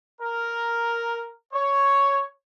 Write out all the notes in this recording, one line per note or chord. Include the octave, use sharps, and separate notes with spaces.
A#4
C#5